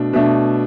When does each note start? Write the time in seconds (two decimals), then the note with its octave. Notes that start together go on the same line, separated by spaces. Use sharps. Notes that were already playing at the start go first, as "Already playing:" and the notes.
Already playing: B2 A3 D4
0.13 B2 A3 D4